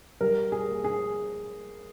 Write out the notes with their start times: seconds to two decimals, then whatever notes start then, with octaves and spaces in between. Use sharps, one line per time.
0.21 G3 A#4
0.52 G#4
0.68 A#3
0.84 G#4